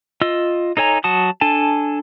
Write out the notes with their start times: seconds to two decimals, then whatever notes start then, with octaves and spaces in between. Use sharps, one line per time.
0.21 F4 D#5 E6
0.77 D#4 A4 C#5 G#5 A#5
1.04 F#3 F#4 A5 D#6
1.41 D4 A4 G#5 A5